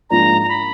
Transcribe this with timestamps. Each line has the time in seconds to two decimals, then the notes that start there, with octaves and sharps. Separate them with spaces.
0.10 G#2 F3 A#3 D4 F4 A#5
0.43 A#5
0.49 B5